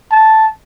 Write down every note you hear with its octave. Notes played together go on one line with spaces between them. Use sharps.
A5